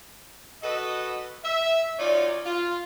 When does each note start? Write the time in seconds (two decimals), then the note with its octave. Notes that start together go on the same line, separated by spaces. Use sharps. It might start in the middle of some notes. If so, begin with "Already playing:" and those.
0.62 F#4 A4 B4 D#5
1.44 E5
1.99 F#2 D#4 F4 C#5 D5
2.45 F4